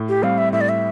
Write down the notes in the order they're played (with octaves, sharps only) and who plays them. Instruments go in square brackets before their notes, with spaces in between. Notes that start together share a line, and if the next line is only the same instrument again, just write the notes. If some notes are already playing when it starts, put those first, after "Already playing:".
Already playing: [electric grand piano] A2
[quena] G4
[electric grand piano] G3 C4 [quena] F5
[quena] E5
[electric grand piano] A2 [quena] E5
[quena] D5
E5